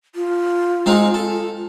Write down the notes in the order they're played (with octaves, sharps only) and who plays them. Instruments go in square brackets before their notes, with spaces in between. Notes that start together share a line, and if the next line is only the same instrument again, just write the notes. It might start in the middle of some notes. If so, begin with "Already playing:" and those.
[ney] F4
[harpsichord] G#3 C4 D#4
A4